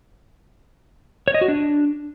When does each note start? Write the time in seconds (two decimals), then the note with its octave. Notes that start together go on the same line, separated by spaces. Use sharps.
1.28 C#5
1.34 D#5
1.41 F#4
1.48 D4